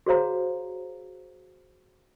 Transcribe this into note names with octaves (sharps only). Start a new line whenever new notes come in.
F#4 G#4 C5 C#5 F5 A#5